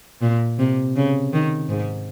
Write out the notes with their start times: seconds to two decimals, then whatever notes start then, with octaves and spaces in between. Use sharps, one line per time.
0.22 A#2
0.58 C3
0.96 C#3
1.33 D#3
1.69 G#2